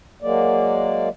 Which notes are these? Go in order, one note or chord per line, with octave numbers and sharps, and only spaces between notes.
F#3 G#3 A#3 D5